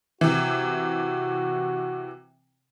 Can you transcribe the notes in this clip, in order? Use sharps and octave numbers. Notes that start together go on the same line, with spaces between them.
C3 E3 F#4